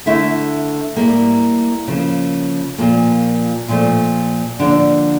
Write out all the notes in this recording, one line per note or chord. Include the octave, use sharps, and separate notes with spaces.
D3 A3 E4 E5
A2 G3 A#3
C#3 F3 A#3
A#2 F3 A#3
A#2 F3 A3
D3 F3 A#3 D4